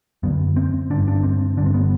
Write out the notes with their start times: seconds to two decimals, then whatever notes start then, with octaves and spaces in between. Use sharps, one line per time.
0.23 F#2 D3 B3
0.56 C4
0.90 G2 D3 D4
1.08 D4
1.23 C4
1.57 G2 D3 D4
1.66 C4
1.74 B3